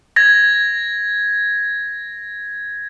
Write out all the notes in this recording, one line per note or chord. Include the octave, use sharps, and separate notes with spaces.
G#6 A#6